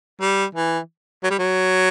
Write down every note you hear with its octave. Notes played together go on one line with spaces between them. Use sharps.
G3
E3
F#3
G3
F#3